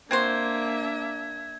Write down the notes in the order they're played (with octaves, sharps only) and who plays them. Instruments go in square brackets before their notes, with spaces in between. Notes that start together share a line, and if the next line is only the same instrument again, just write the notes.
[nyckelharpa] A#3 [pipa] C4 F#4 C5 [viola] D4 E5 [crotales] G#6